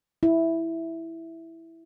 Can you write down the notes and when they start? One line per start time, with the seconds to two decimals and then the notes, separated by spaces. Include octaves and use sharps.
0.23 E4